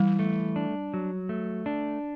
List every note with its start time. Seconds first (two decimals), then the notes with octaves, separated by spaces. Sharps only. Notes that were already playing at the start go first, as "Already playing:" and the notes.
Already playing: E3 G3
0.19 A3
0.56 D4
0.94 F#3
1.29 A3
1.66 D4